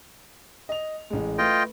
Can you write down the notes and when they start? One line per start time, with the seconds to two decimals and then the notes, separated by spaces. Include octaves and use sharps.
0.69 D#5 F7
1.10 A1 G#3
1.38 A3 F4 B4 D#5 G5